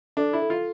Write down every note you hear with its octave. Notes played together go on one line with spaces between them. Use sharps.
D4 A4
E4
A4
F4